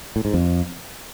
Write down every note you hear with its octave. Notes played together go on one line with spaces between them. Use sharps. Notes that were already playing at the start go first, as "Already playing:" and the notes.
A2
G#2
F2